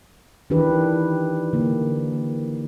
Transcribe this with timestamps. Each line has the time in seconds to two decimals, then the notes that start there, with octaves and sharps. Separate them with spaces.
0.50 D#3 E3 D4 G4 B4
1.53 D3 A#3